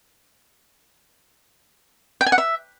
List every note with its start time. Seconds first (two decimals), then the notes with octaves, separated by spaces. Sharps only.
2.21 G5
2.26 G#5
2.32 F#5
2.38 E5